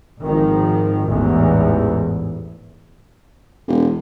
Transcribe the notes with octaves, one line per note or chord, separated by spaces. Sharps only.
G#1 D#3 F3
A1 E2 G#2
E1